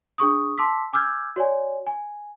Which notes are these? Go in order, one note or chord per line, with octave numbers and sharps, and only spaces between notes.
D4 G#4 C#6 D#6
A5 C6 D6 E6 B6
G#5 D6 E6 F6 G6 G#6
F#4 C#5 D5 G#5
G#5